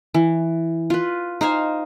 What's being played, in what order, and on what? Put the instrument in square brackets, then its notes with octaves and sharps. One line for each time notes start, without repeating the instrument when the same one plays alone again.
[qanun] E3
F4 B4
D#4 C5 F5 G#5